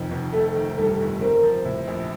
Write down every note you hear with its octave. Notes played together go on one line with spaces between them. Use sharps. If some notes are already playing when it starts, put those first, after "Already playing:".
Already playing: F1 F2 D#3
F1
A3 A4
D#3
G2 A4
G1
C4 A#4
F3
A2
A#1